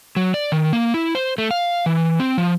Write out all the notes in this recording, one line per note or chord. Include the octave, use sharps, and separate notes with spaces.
F#3
D5
D#3
A#3
E4
C5
A3
F5
E3
C4
F3